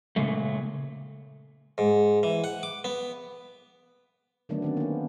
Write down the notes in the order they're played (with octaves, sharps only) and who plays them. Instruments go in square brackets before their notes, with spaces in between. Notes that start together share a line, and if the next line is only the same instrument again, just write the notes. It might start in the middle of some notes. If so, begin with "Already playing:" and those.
[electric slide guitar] A#2 C#3 G#3 A3
[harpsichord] G#2
E3
F#5
D6
B3
[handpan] D3 D#3 F#3 A3 B3 D4
D#3 C4 C#4
A#3 B3